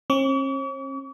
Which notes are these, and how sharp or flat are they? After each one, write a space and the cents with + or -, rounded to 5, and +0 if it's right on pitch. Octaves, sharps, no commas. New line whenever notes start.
C#4 -45 C#6 +45